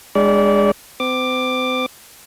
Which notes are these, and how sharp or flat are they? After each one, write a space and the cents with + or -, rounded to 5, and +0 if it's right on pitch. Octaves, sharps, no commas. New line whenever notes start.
G#3 -15 D4 +0 D5 -30
C4 -40 D6 +10